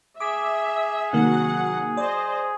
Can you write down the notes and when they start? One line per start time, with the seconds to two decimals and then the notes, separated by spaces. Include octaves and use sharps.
0.20 G#4 E5 D6 B6
1.13 C3 D#3 F#3 A#3 F#5
1.97 C5 D5 D#5